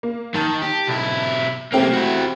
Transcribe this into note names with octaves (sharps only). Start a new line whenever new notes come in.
A#3
D#3 A5
G4
B1 E4
B1 A3 A#3 C4 G4
E4 F#4